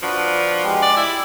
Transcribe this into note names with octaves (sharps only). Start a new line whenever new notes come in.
F3 D4 F#4 B4
G#3 G4
D5
E4